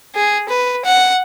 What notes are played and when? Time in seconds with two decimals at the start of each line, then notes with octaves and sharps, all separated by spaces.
0.15 G#4
0.49 B4
0.85 F#5